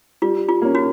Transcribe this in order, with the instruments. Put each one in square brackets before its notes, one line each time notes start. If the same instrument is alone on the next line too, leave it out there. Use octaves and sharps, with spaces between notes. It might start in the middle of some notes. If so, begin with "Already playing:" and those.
[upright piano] G3 [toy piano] F4
[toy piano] F4
[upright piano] A#3 C#4
[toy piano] F#4